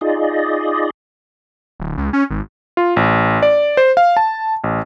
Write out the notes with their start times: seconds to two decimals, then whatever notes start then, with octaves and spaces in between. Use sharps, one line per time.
0.01 D#4 F4 G#4 D5 D#5
1.80 D1
1.98 C#2
2.13 C#4
2.30 G#1
2.77 F4
2.96 A1
3.43 D5
3.77 C5
3.97 F5
4.17 A5
4.64 A1